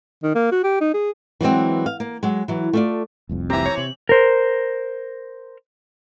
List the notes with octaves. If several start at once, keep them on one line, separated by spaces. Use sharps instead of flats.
D#3
A#3
F#4
G4
D#4
G#4
E3 F#3 G#3 C4
F5
A#3
F#3 G#3
E3 F#3
A3 F4 D5
F1 C2 F2
E3 C4 G4 E5 A#5
C#5
C3 F#7
A#4 C5